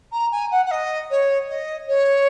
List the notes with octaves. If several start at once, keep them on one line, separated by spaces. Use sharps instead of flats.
A#5
G#5
F#5
F#5
D#5
C#5
D#5
C#5